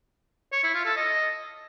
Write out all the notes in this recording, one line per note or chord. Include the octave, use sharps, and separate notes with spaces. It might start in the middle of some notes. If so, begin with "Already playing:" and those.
C#5
E4
F4
A4
D#5